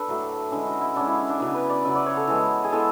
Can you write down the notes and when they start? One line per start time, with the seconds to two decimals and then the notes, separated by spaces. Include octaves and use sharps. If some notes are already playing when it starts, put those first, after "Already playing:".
Already playing: D4 A4 B4
0.08 A2 F#3 A3
0.51 D3 G#3 C#4 E4
0.67 F#4
0.81 E4
0.96 D3 G#3 C#4 D4
1.07 E4
1.18 D4
1.29 D4
1.40 C#3 F#3 B3 E4
1.54 B4
1.70 D5
1.85 C#3 F#3 B3 E5
1.95 D5
2.06 C#5
2.17 A4
2.27 E3 G#3 B3
2.64 G#4
2.72 E3 G#3 B3 A4